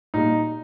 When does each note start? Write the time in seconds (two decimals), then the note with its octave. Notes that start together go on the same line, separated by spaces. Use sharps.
0.14 A#2 G3 D#4